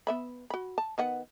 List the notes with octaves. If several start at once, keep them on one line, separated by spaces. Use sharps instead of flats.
B3 E5 B5
F#4 B5
A5
D#3 B3 F#5